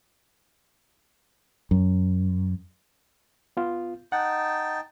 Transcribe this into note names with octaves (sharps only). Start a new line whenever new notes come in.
F#2
B3 F4
D#4 F#5 G5 A5